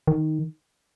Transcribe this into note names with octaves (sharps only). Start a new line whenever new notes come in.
D#3